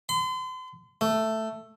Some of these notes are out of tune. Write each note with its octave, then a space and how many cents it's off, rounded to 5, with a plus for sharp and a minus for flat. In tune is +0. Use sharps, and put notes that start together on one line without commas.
C6 -40
A3 +5